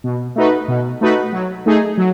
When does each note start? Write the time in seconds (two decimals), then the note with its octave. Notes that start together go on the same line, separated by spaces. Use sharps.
0.04 B2
0.35 A3 D#4 F#4 B4
0.68 B2
1.01 A3 D#4 F#4 B4
1.32 F#3
1.66 A3 D#4 G#4
1.97 F#3